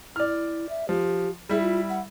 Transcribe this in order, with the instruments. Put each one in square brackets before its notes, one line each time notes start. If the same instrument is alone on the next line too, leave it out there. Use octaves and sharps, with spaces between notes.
[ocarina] E4 [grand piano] D5 F6
[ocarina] E5
[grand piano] F3 [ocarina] G4
[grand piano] G3 E4 [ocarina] G#4
[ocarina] F4
F#5